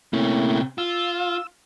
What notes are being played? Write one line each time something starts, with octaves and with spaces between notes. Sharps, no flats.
C3 A3 A#3 C#4 E4
F4 E6